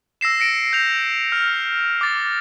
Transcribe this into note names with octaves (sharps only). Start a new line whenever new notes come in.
E6 A#6 C7 E7
A#6 C#7 D7
G6 F7
F6
D6 A6